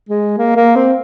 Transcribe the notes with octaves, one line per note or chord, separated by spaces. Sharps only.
G#3
A#3
A#3
C4